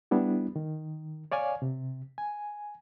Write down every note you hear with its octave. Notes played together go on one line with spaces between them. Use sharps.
G3 B3 D4 E4
D#3
C#5 D5 F5 G#5
C3
G#5